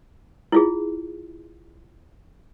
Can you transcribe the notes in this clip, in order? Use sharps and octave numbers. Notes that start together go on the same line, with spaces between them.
E4 F4 G#4